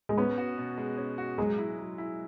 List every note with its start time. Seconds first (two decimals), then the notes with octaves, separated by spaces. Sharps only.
0.09 G#3
0.17 B3 C#4
0.38 F#4
0.58 B2
0.78 G#3
0.98 C#4
1.18 F#4
1.38 F#3 G#3
1.58 E4
1.79 F#3
1.98 E4